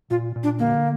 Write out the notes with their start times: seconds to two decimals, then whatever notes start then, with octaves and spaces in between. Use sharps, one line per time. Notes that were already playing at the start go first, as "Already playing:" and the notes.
0.11 A#2 F4
0.36 A#2
0.43 D4
0.59 D3 A#3